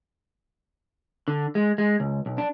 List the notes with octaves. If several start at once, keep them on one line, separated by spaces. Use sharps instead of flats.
D3
G#3
G#3
C#2
B1
D4